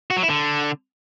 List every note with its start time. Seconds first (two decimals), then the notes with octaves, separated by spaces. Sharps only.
0.10 F#4
0.17 F#3
0.23 E4
0.29 D3